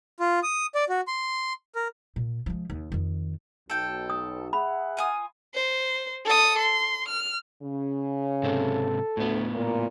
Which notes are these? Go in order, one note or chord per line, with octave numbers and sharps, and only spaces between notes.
F4
D#6
D5
F#4
C6
A#4
A#2
F3 G#3
D#2
F2 D#3
B1 A4 G5
D#6
G#4 E5 F#5 B5
F4 G#5 D#6
C5
A4 D#6
C6
F6
C#3
G#2 C3 C4 A4
D2 A2 B3
A#2 A#4